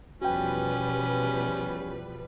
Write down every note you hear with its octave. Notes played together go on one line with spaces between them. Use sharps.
E2 B2 F3 G3 C#4 F#4 B4 G5